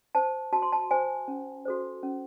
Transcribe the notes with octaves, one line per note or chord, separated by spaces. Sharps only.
C5 A5
F#4 A5
C6
A5
C5 G#5
C#4
F#4 A4 C5
C#4